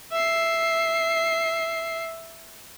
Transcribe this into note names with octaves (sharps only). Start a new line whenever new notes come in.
E5 C7